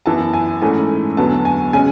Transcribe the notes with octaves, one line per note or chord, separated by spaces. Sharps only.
F#2 E3 B3 A5
G#5
G#2 E3 A3 C#4 G#5
E2 D3 F#3 B3 A5
G#5
C#3 G#3 C#4 G#5